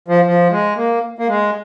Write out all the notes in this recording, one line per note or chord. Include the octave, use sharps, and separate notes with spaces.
F3
F3
G#3
A#3
A#3
G#3